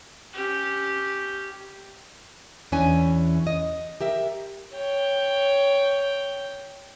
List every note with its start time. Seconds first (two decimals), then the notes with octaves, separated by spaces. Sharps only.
0.34 C#4 G4
2.72 E2 E3 C#4 D4 G#5
3.47 D#5
4.01 G4 A#4 E5
4.75 C#5 G5